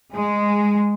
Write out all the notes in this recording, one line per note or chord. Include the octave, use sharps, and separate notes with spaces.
G#3